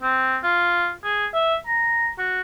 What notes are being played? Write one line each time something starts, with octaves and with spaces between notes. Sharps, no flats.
C4
F4
G#4
E5
A#5
F#4